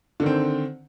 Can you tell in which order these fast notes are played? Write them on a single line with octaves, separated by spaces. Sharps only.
D3 D#3 C4